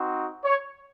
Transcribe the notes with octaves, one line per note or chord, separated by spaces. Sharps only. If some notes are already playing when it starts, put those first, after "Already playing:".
Already playing: C4 D#4 F#4
C#5